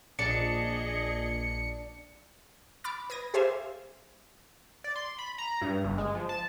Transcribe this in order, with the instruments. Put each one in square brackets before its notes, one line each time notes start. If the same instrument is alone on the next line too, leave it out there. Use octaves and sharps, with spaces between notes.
[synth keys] A#1 A#2 [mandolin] D4 [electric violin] G#4 D#5 [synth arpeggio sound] C#7
[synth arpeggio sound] B5 D6 F6 A6
B4 D#6 G#6 A#6
G4 G#4 C5 E5 F5 G#5
[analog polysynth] D5
C6
B5
A#5
G2
G1
G#3
F3
A5